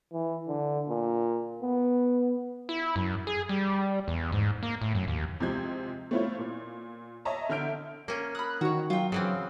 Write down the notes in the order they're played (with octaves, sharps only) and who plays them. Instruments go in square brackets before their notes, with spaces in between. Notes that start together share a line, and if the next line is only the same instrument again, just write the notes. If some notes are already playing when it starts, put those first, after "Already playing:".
[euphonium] E3
D3
A#2
B3
[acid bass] E4
F#2
G#4
G3
E2
G#2
A#3
A2
F#2
D#2
[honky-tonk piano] C3 F3 G#3 G6 G#6
A3 C4 E4 F4 C#5
A#2
C#5 D#5 E5 A5 A#5
D3 E5 F6 G6 D7
[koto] A#3 C#4
[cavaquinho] B5 D#6 [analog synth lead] F#6
[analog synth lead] D#3 [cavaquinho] F#4 C#5
[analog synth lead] F#3 [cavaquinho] F4 G5
[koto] C#3 E3 C4 [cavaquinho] F5